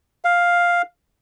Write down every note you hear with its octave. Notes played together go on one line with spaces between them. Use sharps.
F5